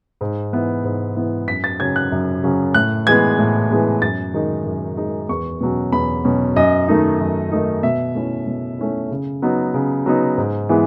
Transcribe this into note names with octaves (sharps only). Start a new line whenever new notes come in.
G#2
E3 B3 E4
G#2
E3 B3 E4
F#2 B6
A6
C#3 F#3 C#4 G#6
F#6
F#2
C#3 F#3 C#4
A2 F#6
E3 G#3 B3 G#6
A2
E3 G#3 B3
F#2 A6
D#3 G#3 D#4
F#2
D#3 G#3 D#4
E2 C#6
B2 F#3 C#4
E2 B5
B2 F#3 C#4
F#2 D#5
D#3 A3 D#4
F#2
D#3 A3 D#4
B2 E5
A3 C#4 E4
B2
A3 C#4 E4
C#3
F#3 B3 D#4
C#3
F#3 B3 D#4
G#2
E3 G#3 B3 E4